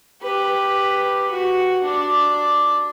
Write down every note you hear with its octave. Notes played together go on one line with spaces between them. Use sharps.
G4 B4
F#4
D4 D5